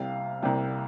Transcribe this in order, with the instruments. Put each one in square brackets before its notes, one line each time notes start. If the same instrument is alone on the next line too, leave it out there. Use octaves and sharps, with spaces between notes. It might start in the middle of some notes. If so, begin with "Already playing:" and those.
Already playing: [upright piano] C2 C3 G3 F5
C2 C3 G3